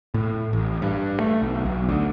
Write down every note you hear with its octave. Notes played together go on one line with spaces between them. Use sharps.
A2
A1
G2
A3
B1
B1
D2